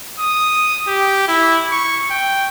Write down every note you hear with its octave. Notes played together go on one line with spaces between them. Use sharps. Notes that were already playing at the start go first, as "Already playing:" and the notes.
D#6
G4
E4
C#6
G5